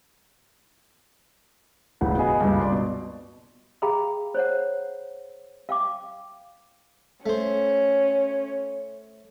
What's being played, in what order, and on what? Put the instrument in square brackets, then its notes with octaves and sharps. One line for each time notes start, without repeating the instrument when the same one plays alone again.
[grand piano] E1 C#2 A2 F#5
B3 F#4 G#4 D#5
F#1 C#2 G2
D5 C6
B2
[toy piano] G#4 F5 G5 A#5 B5
C5 C#5 F#5
F5 G5 D6
[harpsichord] A3 C5 [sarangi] C#4